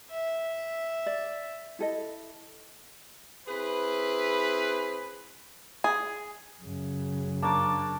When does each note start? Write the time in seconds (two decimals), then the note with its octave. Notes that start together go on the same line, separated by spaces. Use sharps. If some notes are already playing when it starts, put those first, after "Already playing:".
0.11 E5
1.06 D5
1.79 E4 A4 D#5
3.48 C4 E4 G#4 B4
5.84 G#4
6.62 F#2 C#3
7.43 A#3 D4 A5 C#6 D6